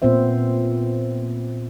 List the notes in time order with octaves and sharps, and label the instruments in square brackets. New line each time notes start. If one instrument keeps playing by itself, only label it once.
[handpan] A#2 B3 C4 C5 E5